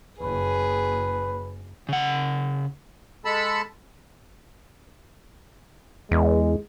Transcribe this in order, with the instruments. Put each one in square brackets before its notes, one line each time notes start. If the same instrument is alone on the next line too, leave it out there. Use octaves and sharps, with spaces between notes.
[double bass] F#1 [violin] G#4 [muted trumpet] B4
[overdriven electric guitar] C#3 F#5
[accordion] G#3 A4 A5 B5 E6
[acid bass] E2 [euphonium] G#3